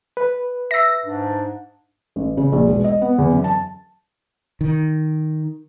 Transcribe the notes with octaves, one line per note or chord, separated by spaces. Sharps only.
B4
E5 E6 A#6
G#2 D4
A1
C#3
A#1
E1
D#5
B3
E2
F#2
A5
D#3